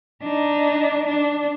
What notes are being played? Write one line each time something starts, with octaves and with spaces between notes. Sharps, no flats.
D4 D#4
D4